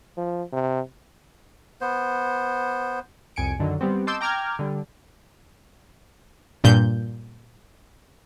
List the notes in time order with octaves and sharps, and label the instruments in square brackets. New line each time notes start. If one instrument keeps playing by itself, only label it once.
[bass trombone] F3
C3
[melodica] B3 C5
[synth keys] C2 F2 G#5 C#7 D7
F#2 D3 D#3 F#3
G3 B3 C4
D#5 A5 C6 D6 E6 G6
G5 A#5 D6 F6 G6 G#6
D3 G3
[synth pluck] G2 A#2 G6